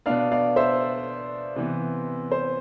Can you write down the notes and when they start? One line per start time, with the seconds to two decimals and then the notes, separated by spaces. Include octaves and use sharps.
0.06 B2 B3 D4 D5 F5
0.31 D5 F5
0.56 C5 E5
1.56 C3 E3 B3
2.31 C5